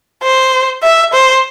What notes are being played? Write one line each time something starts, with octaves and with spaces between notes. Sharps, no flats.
C5
E5
C5